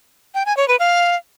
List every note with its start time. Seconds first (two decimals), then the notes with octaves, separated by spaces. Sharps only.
0.34 G5
0.46 G#5
0.57 C#5
0.68 B4
0.79 F5